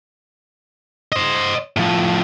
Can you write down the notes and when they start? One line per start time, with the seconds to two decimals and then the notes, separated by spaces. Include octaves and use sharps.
1.12 C5 D#5
1.77 A2 F3